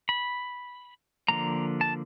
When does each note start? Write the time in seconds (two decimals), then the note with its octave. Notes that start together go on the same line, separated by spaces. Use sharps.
0.09 B5
1.28 D3 F3 A#3 A#5
1.81 A5